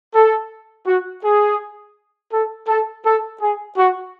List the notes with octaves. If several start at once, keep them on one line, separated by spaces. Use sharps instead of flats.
A4
F#4
G#4
A4
A4
A4
G#4
F#4